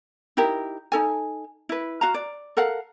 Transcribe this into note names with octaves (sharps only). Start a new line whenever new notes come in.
D#4 E4 G4 A#4
D#4 A4 G#5
E4 B4
F#4 F5 A#5
D5
A4 A#4 F5 F#5